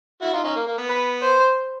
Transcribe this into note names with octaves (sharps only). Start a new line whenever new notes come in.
E4 F#4
D#4 F4
C#4 D#4
A#3
A#3
B3
B4
C5